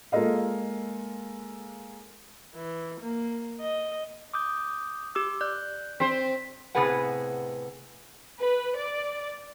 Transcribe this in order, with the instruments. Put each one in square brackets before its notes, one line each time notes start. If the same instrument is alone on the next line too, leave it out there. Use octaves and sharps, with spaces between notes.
[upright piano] G#3 A#3 F4 A4 D#5 F5
[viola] E3
A#3
D#5
[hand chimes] D6 D#6 G6
[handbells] G4 D6 E6
[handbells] D5 [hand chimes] F#6 G6
[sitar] C4 C5 [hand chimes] B6
[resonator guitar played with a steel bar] A2 C3 B3 G#4 B4 F#5
[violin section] B4
D5